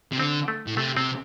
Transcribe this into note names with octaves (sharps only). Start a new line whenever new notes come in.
C3
D3 C4
A3
A2
C3 A3
C3 C4